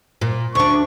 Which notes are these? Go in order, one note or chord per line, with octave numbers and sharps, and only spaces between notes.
A#2
D2 D4 C#6